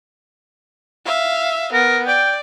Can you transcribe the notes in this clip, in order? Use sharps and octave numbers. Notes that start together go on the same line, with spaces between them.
E5 F5
B3 A#4
D5 G5